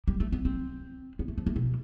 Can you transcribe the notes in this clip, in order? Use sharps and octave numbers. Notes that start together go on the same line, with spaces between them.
G3
A3
B3
C4
B3
A3
F3
A3
B2